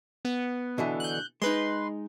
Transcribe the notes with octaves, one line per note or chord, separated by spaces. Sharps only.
B3
B2 D3 E3
F#6 G6
G#3 D#4 B4 C6